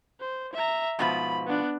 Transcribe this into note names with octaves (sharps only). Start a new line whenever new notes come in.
C5
E5 A#5
G#2 B2 F3 B5
B3 D4